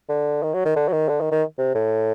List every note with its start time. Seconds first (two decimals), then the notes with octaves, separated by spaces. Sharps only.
0.09 D3
0.43 D#3
0.54 F#3
0.65 D#3
0.76 D3
0.89 F#3
0.92 D#3
1.08 D3
1.21 D#3
1.32 D#3
1.58 C3
1.75 A2